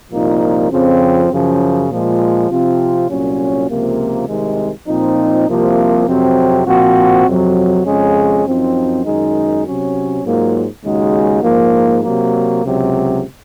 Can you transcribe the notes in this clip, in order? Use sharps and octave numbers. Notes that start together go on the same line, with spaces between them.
C2 A#2 F3 A#3 D#4
F2 C#3 F3 C4
F#2 C#3 F3
A#2 F3 G#3
C3 F3 C4 F4
C2 A#2 F#3 C#4
C#2 C3 F3 A#3
C2 C3 D#3 G#3
A#2 F3 C4 D#4
C2 C3 F3 A#3
F2 C3 F#3 C4
A#2 F3 C4 F#4
F2 C3 F#3
F2 C#3 G#3 C#4
F#2 F3 C4 D#4
F#2 D#3 G#3 D#4
C3 F#3 C#4
G#2 F#3 A#3 F4
D#2 C#3 G#3 D#4 F#4
G#2 F3 A#3
C3 F#3 A#3
C#2 C3 F#3